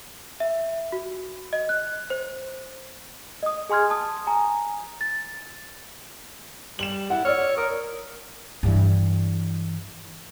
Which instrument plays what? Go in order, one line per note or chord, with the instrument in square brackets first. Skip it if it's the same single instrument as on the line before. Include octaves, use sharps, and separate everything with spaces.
[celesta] E5
F#4
D#5
F#6
C5
D#5 D#6
G#4 G#5 C6 F6 G#6
A5 D#6
G#5 A#5
A6
[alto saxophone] G3 [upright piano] E7 F#7
[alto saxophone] E4 [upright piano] F#5
[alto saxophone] C#5 [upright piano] D5 E6 F6
[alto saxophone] A#4 [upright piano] D#6
[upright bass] G2 E3